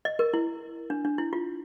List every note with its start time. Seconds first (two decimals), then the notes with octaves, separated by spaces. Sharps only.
0.05 D#5
0.19 A#4
0.34 E4
0.90 D4
1.05 D4
1.18 E4
1.33 F4